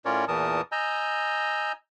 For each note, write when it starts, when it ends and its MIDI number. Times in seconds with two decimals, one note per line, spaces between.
0.05 0.25 45
0.05 0.25 61
0.05 0.25 65
0.05 0.25 70
0.05 0.25 73
0.05 0.25 74
0.28 0.61 40
0.28 0.61 46
0.28 0.61 52
0.28 0.61 70
0.28 0.61 81
0.28 0.61 87
0.72 1.72 75
0.72 1.72 80
0.72 1.72 82
0.72 1.72 88
0.72 1.72 91